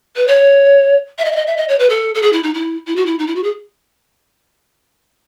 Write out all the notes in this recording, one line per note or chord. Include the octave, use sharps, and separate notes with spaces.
B4
C#5
E5
D#5
E5
D#5
E5
D#5
C#5
B4
A4
A4
G#4
E4
D#4
E4
E4
F#4
E4
D#4
E4
F#4
G#4